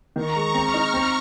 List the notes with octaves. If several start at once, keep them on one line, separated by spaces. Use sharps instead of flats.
D#3 A#5 C#6
G#3
C4 C#6 F6
D#4
C4